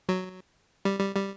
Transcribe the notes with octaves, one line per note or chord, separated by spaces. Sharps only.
F#3
G3
G3
G3